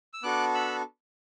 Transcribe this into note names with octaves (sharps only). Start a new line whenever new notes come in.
E6
B3 D4 F#4 A4 D6 F#6
B5 E6